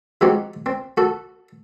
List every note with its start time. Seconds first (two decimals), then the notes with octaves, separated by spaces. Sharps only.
0.21 F3 G#3 C4 D#4 F#4 G4
0.66 C4
0.97 F#4 A4